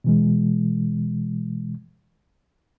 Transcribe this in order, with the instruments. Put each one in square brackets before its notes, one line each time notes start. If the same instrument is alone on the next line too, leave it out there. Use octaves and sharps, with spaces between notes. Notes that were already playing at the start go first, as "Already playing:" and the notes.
[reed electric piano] B2 E3 G#3